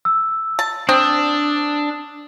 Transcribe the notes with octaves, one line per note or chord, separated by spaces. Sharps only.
E6
A5
C4 D4 D#6 E6